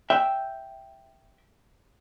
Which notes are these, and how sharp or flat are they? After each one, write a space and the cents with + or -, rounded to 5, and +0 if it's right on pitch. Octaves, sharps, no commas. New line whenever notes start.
E5 +0 G5 +0